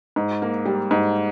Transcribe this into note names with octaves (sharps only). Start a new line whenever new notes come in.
G#2
A#3
G3
G#2